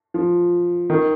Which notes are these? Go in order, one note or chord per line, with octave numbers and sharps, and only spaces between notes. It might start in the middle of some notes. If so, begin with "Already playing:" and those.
F3
D#3